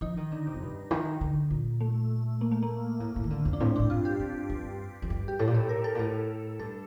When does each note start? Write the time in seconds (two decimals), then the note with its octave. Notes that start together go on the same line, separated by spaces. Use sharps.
0.01 F3 D#4
0.17 D#3
0.32 D3
0.47 C3
0.54 F2
0.62 G2
0.91 D#3
1.21 D3
1.50 A#2
1.81 A3
2.41 A#3
2.52 A3
2.63 A#3
3.00 A2
3.16 A2
3.24 D#3
3.30 D3
3.45 F2
3.53 D4
3.60 A2 C4
3.76 A2 D4
3.90 G2 F4
4.05 G4
4.19 G2
4.50 G2
5.02 F2
5.10 G2
5.28 G4
5.39 A2 A4
5.47 A#2
5.54 A2 G4
5.69 A#4
5.84 A4
5.95 A#2
5.99 A2 A4
6.59 G2 A4